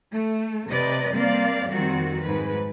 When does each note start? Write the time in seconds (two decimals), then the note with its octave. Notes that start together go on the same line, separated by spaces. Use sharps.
0.13 A3
0.69 C3 B4 D5 D#5
1.13 G3 A#3 C4 D5 F5
1.69 F2 D#3 G3 C4 F#4
2.22 G#2 B4